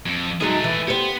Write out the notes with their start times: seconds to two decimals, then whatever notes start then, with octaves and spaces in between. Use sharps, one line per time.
0.06 F2
0.41 F#3 G#3 A3 D#4 G#4
0.64 E3
0.88 B3 G4 C5